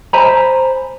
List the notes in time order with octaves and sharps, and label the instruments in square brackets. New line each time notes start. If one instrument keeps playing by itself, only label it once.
[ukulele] C5 G#5 A#5 B5